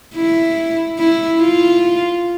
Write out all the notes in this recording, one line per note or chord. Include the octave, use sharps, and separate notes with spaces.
E4
E4
F4